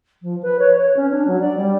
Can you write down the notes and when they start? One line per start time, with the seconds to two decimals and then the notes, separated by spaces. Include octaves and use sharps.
0.23 F3
0.43 B4
0.59 C#5
0.77 C#5
0.97 C#4
1.11 D4
1.27 F#3
1.41 D5
1.57 G3